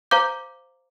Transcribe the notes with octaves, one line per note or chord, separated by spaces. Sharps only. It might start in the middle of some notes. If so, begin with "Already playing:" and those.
C5 F5 A#5 D6 G6